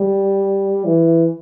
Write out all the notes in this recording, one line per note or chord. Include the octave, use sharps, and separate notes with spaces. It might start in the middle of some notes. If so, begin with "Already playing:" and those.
Already playing: G3
E3